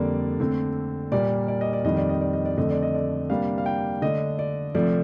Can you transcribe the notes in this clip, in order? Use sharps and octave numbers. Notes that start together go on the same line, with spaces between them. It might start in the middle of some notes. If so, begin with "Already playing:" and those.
Already playing: F2 D3 G3 A#3 D5
D3 A3 C4
A#2 G3 A#3 D5
D5
D#5
D5
F2 D#3 G3 D#5
D5
D#5
D5
D#5
D5
F2 D3 A3 C4 D#5
D5
D#5
D5
C3 G3 A#3 D4 F5
F5
G5
D3 A3 D4 D#5
D5
C3 F3 A3 D5